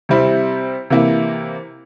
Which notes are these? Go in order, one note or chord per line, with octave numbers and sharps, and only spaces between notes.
C3 G3 C4 E4
C3 E3 A#3 E4